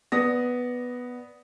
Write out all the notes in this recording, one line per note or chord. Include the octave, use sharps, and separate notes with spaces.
B3 D5 D#6 A#6